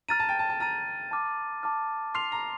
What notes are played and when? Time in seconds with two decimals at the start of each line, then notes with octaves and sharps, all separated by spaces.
0.09 A#5 F6 A6 D#7
0.20 A5
0.29 G5
0.39 A5
0.49 A5
0.60 A#5 F6 A6 D#7
1.11 A5 D6 F6
1.63 A5 D6 F6
2.15 C6 F6 C7 F7
2.32 A#5